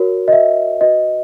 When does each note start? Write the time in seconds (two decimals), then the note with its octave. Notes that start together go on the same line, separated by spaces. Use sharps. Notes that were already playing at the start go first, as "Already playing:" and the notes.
Already playing: F#4 A#4 C#5
0.28 D#5
0.33 E5
0.81 F#4 B4 D#5